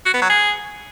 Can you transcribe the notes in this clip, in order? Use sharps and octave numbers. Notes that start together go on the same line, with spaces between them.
F#4
B3
F#3
G#4